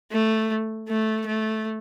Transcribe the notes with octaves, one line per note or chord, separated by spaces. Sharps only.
A3
A3
A3